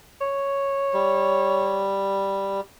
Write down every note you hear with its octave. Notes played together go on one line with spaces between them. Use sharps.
C#5
G3